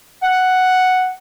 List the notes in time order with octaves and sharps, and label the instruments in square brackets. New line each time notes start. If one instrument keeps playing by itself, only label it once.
[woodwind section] F#5